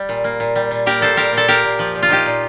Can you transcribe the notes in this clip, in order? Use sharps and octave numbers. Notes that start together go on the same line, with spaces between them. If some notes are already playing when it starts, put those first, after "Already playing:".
Already playing: G3
A#2
A#3
A#2
G3
A#2
A#3 G4 A#4
A#2 A4 C5
G3 G4 A#4
A#2 A4
A#3 G4 A#4
A#2
F3
A#2
F4
A#3 D#4 G4
A#2